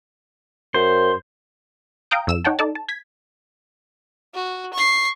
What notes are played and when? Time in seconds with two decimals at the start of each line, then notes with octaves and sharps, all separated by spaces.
0.74 F#2 C5
2.11 F5 G5 A#5 D#6 G6 D7
2.27 F2 E6 E7
2.45 D#4 C#5 F#5 G5 A5
2.59 D#4 A4 D5 A5
2.75 A5
2.89 G#6 B6
4.34 F#4
4.73 C#6 C7